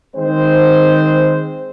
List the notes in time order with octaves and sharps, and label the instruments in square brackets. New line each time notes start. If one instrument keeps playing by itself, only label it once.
[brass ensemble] D#3 G#3 C4 C5